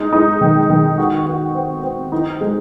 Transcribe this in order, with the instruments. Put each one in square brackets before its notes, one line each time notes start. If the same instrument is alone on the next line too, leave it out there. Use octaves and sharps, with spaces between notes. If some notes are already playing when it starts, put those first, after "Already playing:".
Already playing: [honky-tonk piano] G#3 D#4
D#4
D#3
D#3
F#4
F#4
C4
C4
D#4
G#3